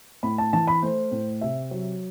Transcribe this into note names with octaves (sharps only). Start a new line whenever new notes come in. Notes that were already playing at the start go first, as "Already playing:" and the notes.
A2 B5
A5
E3 A5
B5
A3 C5
A2
C3 E5
F#3